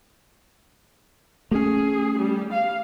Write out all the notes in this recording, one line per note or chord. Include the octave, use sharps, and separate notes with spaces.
A3 C#4 G#4
G3
F5